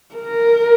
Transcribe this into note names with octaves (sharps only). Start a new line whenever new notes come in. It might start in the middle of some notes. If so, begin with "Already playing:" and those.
A#4